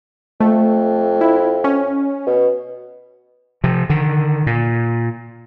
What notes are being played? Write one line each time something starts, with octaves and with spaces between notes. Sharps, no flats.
F2 A3
E4
C#4
B2
C3 F3
D3 D#3
A#2